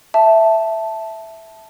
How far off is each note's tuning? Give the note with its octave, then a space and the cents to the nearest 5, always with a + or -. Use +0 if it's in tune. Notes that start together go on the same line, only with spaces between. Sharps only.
E5 +0 A5 +0